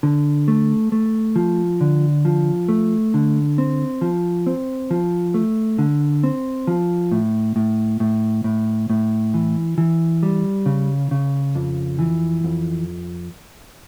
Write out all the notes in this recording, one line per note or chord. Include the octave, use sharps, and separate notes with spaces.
D3
A3
A3
F3
D3
F3
A3
D3
C4
F3
C4
F3
A3
D3
C4
F3
A2
A2
A2
A2
A2
E3
E3
G3
C#3
C#3
F2
E3
F2